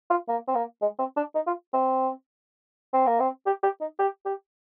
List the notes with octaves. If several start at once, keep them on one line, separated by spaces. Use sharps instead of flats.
F4
A#3
C4
A#3
G#3
C4
D4
D#4
F4
C4
C4
A#3
C4
G4
G4
D#4
G4
G4